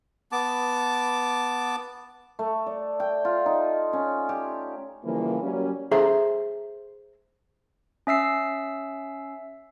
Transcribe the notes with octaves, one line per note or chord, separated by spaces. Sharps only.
B3 A5 D6
A3
D5
G5
F4
D#4
C#4
G4
C#3 E3 F3 G3 A#3
F#3 G3 A#3 C#4
G#4 A4 C5 E5 A#5
C#4 E5 E6 C7